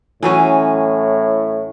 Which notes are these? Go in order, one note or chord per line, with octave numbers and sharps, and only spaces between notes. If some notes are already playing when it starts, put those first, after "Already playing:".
A2 E3 F#3 C#4